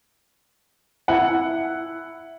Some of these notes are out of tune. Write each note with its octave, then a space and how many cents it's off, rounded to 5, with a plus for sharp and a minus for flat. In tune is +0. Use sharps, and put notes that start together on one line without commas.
E4 +0 F#5 +0